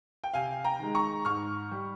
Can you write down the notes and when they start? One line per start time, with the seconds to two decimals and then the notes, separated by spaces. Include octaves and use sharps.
0.24 G5
0.34 C3 F5 G#5
0.65 G5 A#5
0.79 D#3 G#3
0.95 A#5 C#6
1.25 G#2 C#6 F6
1.71 G3